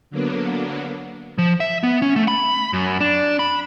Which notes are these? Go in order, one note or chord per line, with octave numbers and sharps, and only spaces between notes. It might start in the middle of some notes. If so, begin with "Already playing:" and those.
D3 F#3 A#3 B3 D4
F3
E5
B3
C#4
A3
B5
F#2
D4
B5